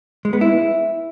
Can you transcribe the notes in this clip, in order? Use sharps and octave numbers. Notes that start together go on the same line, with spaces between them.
G#3
B3
E4